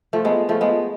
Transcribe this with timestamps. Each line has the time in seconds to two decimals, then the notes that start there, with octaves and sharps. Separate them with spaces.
0.13 F3 A3
0.25 G#3 B3
0.49 F3 A3
0.61 G#3 B3